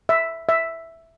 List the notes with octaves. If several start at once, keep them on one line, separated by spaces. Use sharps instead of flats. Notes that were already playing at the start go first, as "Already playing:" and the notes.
E5
E5